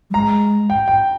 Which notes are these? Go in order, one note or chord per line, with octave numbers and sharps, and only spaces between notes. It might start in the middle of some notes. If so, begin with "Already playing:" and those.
G3
G#3 A#5
G5
G5